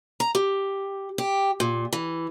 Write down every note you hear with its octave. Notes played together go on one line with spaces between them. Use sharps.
A#5
G4
G4
A#2
E3